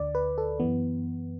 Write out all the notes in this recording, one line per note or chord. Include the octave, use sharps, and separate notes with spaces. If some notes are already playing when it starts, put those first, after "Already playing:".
Already playing: D2 D3 D5
B4
A4
F#2 E3 B3